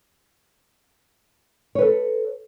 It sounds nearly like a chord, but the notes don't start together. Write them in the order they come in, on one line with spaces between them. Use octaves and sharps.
C#5 B4 A4